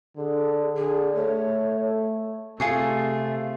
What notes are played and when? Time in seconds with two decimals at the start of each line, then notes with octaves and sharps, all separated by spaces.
0.17 D3 G#4
0.76 D3 G#4
1.16 A3 C#5
2.60 C3 A3 F4 G#4 C#6